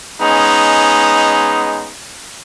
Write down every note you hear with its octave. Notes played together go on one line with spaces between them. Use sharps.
G#3 B3 C#4 D#4